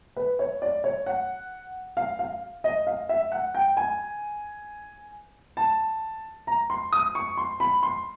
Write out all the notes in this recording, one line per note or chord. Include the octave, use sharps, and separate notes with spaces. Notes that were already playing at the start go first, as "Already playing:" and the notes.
B4
C#5
D5
C#5
F#5
F5
F5
D#5
F5
E5
F#5
G5
G#5
A5
A#5
C6
D#6
C#6
C6
B5
C6